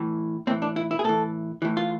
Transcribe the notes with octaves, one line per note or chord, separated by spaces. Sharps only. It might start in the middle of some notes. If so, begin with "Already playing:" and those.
Already playing: A2 E3
A2 E3 C4
D4
E4
E4
G#4
A2 E3 A4
A2 E3
F4